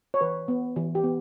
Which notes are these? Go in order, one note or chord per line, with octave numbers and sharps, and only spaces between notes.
C#5
E3 B4
B3
E3
G4
B3